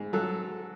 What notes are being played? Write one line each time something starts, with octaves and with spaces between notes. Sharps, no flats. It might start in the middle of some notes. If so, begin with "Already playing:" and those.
Already playing: G#2
F#3 A4